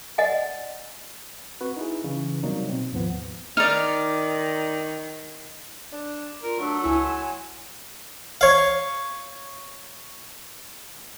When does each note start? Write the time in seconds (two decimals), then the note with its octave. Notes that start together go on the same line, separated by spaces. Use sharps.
0.18 D5 D#5 F#5 G#5
1.61 C4 F#4 B4
1.77 D#4 E4 G#4
2.04 C#3 E3
2.43 C3 F#3 G3 A#3 D#4
2.69 B2 C4
2.92 D#2 G#2 F3 B3
3.57 D#3 D#4 D5 F6
5.92 D4 D5
6.43 F4 A#4
6.59 F#3 A3 D4
6.84 C#2 E4 G#5
7.04 C6 E7
8.41 C#5 F5